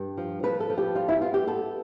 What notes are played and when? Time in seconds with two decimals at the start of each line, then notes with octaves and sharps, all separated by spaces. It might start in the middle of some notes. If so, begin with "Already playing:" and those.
Already playing: G2
0.17 F3
0.43 F3 B4
0.60 A4
0.70 F3
0.78 G4
0.95 G3 F4
1.08 E4
1.21 B3 F4
1.34 G4
1.47 B3 A4